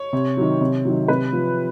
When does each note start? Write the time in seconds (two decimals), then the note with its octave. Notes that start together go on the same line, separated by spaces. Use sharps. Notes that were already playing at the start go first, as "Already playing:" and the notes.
Already playing: C#5
0.13 C3
0.37 D#3 F#3
0.61 C3
0.85 D#3 F#3
1.08 C3 B4
1.33 F3